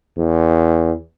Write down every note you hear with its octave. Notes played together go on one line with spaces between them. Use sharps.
E2